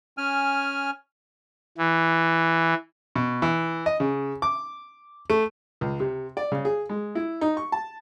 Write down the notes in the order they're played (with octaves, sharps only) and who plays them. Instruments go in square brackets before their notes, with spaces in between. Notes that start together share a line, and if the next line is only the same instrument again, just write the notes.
[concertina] C#4 G#5 F6
[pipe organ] E3
[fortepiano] B2
E3
D#5
C#3
D6
A3
C#2
C3
D5
C#3
G#4
G#3
E4
D#4
C#6
A5